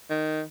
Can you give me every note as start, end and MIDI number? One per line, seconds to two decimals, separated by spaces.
0.10 0.43 51